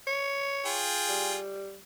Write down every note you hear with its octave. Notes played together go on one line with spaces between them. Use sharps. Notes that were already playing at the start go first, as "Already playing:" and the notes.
C#5
F4 G#4 G5
G3